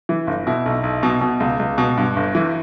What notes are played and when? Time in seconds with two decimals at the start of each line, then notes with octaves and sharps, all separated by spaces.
0.09 E3
0.27 G1
0.47 B2 E4
0.66 B1
0.83 B1
1.03 B2
1.21 B2
1.40 C#2
1.59 C#2
1.78 B2
1.97 G2
2.16 G1
2.35 E3